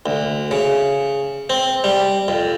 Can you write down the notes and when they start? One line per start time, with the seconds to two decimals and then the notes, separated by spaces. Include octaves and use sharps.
0.06 D2
0.51 C#3
1.50 C4
1.84 G3
2.28 F2